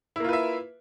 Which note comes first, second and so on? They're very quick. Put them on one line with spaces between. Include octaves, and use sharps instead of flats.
E4 A#3 F4 B4 E5